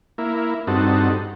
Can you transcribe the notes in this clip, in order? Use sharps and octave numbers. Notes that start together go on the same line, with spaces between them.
A#3 E4
G2 C4 D#4 F#4 A4